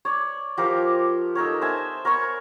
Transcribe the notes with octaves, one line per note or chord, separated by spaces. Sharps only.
C#5 D5
F3 G4 A#4 D6
D#4 A4 A#4 C#5
C5 E5 G#5 A5
A#4 C#5 B5 C#6